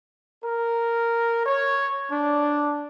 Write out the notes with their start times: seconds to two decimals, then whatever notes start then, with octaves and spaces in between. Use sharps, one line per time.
0.42 A#4
1.46 C#5
2.11 D4